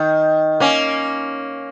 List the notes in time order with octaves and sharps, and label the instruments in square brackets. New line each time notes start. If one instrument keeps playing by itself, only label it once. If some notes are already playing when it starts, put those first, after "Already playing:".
Already playing: [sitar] D#3
A#3 C#4